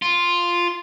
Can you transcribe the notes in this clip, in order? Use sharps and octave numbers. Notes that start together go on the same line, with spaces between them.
F4